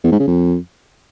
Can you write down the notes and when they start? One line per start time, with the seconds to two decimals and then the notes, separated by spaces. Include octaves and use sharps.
0.04 E2
0.12 G#2
0.20 C#3
0.28 F2